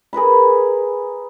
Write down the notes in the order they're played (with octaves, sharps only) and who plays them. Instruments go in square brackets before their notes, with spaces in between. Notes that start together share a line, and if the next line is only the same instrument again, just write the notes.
[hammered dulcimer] G#4 A#4 B4 B5